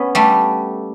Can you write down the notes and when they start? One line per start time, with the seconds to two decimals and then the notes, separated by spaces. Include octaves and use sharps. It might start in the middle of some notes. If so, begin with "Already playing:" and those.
Already playing: B3 C#4
0.15 G3 A3